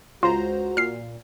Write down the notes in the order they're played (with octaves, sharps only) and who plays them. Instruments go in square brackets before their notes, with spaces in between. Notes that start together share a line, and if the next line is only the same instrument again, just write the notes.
[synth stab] C#2 C5 A#5 [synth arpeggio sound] F4 [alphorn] F#4
[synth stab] A#2 [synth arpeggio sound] F6 C7